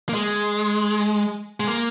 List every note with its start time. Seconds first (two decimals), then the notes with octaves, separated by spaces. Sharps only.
0.09 A#3
0.14 G#3
1.60 G#3
1.67 A#3